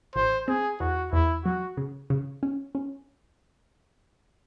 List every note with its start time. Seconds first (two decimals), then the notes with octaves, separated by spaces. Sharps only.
0.16 A1 C5
0.48 C4 G#4
0.80 E2 F#4
1.12 E2 E4
1.45 F#3 F#4
1.77 C#3
2.10 C#3
2.43 C#4
2.75 C#4